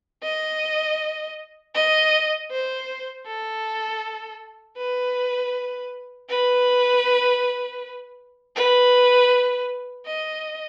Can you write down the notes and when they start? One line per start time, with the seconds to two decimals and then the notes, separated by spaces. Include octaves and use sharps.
0.23 D#5
1.75 D#5
2.51 C5
3.26 A4
4.77 B4
6.29 B4
8.56 B4
10.06 D#5